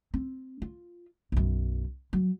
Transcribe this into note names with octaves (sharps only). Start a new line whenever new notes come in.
C4
F4
B1 F#2
F#3